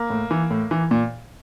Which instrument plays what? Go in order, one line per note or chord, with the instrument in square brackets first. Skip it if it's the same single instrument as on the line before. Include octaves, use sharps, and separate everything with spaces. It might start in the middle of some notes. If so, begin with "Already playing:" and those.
Already playing: [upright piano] A#3
A2
E3
A2
E3
A#2